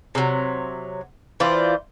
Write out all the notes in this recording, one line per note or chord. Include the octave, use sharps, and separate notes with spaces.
C3 F#3
E3 F4 C5 D5